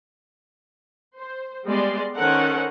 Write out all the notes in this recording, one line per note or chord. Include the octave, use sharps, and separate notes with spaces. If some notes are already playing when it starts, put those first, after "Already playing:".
C5
G3 G#3 B3 D5 C6
D#3 C#4 A4 A#4 C5 F#5